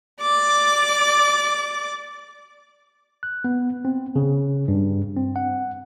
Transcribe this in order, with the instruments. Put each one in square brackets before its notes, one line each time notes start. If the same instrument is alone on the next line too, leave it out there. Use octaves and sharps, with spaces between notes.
[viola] D5 D6
[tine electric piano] F#6
B3
C4
C#3
G2
C4
F#5